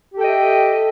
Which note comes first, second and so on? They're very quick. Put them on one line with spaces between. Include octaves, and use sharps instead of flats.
G4 A4 G5 D#5 E5